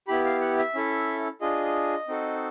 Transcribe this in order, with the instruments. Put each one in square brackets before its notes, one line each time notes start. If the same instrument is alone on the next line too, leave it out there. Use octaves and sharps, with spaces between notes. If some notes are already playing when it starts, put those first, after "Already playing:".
[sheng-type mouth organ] B3 E4 G4 B5
F5
F#5
E5
C#4 E4 A4
D4 F4 G#4 D#5
C4 D#4 F#4 A4